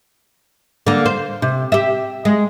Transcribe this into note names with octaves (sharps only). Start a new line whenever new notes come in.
D3 A#3
C5
C3
G4 E5
G#3